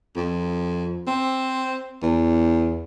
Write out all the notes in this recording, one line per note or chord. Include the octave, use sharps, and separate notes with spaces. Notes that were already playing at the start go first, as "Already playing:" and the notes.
F2
C4
E2